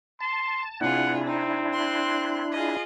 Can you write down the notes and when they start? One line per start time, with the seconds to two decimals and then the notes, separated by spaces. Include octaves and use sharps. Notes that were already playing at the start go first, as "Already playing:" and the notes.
0.21 A5 C6
0.81 C3 D4 E4 F4 G#4 F#5
1.27 C4 D#4
1.71 C6 F#6
2.53 F4 G#4 D#5